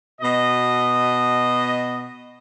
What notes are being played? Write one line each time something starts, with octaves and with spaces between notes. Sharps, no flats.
B2 D#5